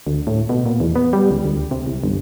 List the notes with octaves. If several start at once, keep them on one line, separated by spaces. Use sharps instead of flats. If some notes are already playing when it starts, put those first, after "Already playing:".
D2
A2
B2
A#2
E2
B3
G3
C#2
D2
C3
C2
G1